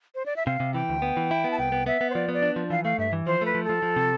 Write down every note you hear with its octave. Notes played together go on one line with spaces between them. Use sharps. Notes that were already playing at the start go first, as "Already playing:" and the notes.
C5
D5
E5
C3 F5
C3
E3 G5
D2
B3
E3
E4
B3
A5
C2 G5
B3
B3 E5
B3
C5
F3 D5
B3
D5
D4
F3
E3 F5
A3 F5
G2 E5
E3
F3 C5
A3 B4
F3
A4
F3
F3
C3